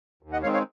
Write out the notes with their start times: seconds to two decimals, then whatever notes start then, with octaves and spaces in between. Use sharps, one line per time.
0.23 D#2
0.32 D#5 F#5
0.42 D#3 G#3 C4 C#5 F5
0.54 C#5 F5